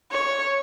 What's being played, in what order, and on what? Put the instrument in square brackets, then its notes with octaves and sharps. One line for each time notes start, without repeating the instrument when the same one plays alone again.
[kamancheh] C#5